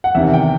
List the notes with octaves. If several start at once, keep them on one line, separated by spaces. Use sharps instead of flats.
F#5
E2 C3 D#3 E5
G5